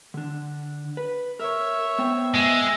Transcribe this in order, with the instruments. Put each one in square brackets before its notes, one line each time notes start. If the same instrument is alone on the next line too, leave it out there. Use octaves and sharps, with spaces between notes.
[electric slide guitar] D3 D4
B4
[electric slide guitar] A#4 [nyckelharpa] C#5 E5
[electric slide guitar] B3 C5 G5
[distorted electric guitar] G#3 [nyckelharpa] E5